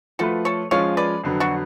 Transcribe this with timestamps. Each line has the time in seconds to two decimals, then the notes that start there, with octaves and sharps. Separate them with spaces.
0.19 F3 A3 F4 F#4 A4 B4
0.45 A4 C#5
0.71 F3 G#3 C#4 F4 C#5 F5
0.97 B4 D5
1.24 F2 D3 F#3 B3
1.40 D4 F#4